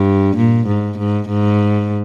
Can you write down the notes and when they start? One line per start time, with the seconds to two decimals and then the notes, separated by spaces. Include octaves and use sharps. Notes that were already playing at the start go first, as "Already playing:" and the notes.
Already playing: G2
0.36 A#2
0.67 G#2
0.99 G#2
1.29 G#2